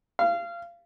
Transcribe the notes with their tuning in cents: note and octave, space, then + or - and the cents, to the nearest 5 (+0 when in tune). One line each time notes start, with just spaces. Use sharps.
F5 -25